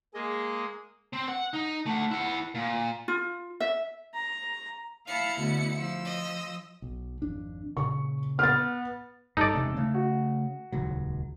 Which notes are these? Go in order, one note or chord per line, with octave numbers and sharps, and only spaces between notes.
G#3 A#3 G#4 D#5
C4
F#5
D#4
A3 F#5
E4 F#5
A#2
F4
E5
A#5
E4 F5 A5 B5 C#7
D2 B2 D3
F3 E6
D#5
B1
G#1 F2 D4
A#2 C#3 C#6
B3 F6 A6
G2 D#4 A4 D5
E1 C3 G#3
C#3 A3
F#4
D#1 C#2 F#3